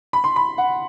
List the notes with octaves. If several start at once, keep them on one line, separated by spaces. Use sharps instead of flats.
B5
C6
B5
F#5